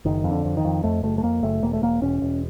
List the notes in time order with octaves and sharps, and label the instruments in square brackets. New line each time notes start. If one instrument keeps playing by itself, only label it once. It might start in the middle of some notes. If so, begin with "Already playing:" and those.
[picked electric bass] F#1 D#3
F2
D3
F2
D#3
F2
F2 A3
F#1 A3
A3
F2 A#3
F#1 A3
E1 A#3
A3
E1 A#3
E1 C#4
E1